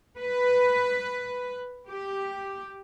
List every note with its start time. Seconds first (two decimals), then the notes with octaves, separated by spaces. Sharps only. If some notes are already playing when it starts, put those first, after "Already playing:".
0.18 B4
1.89 G4